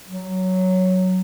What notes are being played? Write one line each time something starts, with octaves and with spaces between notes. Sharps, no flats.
F#3